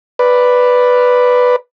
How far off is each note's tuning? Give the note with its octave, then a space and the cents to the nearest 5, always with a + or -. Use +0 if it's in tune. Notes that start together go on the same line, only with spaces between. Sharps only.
B4 +0 D5 +0